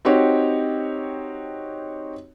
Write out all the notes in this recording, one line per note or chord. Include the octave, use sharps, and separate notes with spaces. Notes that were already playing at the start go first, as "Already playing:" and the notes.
C4 D#4 F#4 G4 C#5